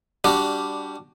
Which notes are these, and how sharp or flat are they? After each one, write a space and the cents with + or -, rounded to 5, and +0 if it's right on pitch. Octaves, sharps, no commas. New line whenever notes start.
G3 +0 D4 -5 F#4 +15